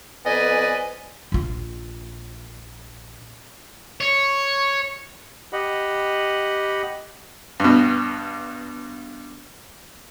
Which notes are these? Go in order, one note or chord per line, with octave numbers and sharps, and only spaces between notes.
F2 B3 B4 D5 D#5 G#5
A#1 F4
C#5
G4 D#5 F#5 B5
G2 B2